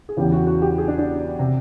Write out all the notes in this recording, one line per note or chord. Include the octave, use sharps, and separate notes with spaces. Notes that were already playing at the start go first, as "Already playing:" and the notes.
G#4
E2 C#3 E3 G4
F#4
F#4
G4
G#4
D4
D4
C3